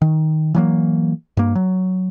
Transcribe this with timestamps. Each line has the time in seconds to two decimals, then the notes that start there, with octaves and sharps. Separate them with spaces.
0.02 D#3
0.55 E3 F#3 A#3
1.37 G2 A#3
1.55 F#3